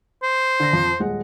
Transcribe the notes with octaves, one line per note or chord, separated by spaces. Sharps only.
C5
D3 A#6
F2 F3
D#1 G#3 F#5